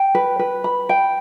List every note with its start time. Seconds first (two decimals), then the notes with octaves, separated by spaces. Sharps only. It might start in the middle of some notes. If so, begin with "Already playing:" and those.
Already playing: G5
0.15 B4
0.39 B4
0.64 B5
0.89 G5